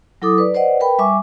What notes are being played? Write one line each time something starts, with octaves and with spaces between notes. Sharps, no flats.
F#3 E4 A4 D6 D#6
B4 D5
B4 C5 D5 D#5 F#5
A#4 B4 G5 B5
G3 E5 G#5 C#6 D6